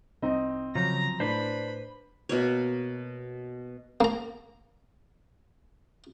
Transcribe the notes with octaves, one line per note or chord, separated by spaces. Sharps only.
C2 C4 D#4 D#5
C#3 F3 F#3 A#5
A2 D4 B4 C5 B5
B2 A#3 C#5
A#3 A#5